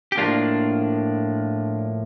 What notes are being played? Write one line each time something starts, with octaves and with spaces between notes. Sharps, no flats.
G4
A2 F3 A#3 D4 F4